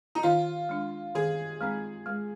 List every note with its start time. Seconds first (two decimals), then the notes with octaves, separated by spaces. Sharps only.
0.15 D#4
0.23 D#3 F4
0.69 G#3 D4
1.15 D#3 G#4
1.61 G#3 C4 D#4
2.06 G#3